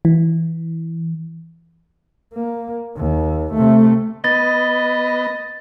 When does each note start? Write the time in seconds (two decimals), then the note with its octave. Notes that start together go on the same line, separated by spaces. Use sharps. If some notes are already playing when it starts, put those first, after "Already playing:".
0.05 E3
2.34 A#3
2.97 D#2
3.54 C3 A3
4.24 B3 D#5 A6